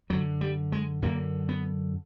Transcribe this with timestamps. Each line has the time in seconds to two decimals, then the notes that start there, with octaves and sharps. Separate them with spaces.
0.10 F#2 D3 F#3
0.41 G3
0.72 G#3
1.02 F#2 D3 A#3
1.49 B3